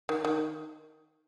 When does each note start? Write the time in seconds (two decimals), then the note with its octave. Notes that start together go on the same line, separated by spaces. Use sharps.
0.09 D#3
0.25 D#3